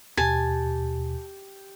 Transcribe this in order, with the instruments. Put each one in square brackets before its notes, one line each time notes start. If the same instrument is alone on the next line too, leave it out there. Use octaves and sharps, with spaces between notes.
[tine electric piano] D#2 B2 [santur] G4 [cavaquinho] G#5 A5